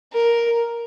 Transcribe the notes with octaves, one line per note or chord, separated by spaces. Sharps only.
A#4